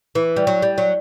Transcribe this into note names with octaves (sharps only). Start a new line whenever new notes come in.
E3
G3
F#3
G3
F#3